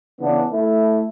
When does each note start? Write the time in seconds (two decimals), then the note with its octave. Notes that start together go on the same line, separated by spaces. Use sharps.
0.21 C#3 E3 B3 D4
0.52 A3 E4